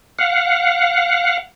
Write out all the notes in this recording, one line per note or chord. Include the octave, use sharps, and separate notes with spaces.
F5 F#5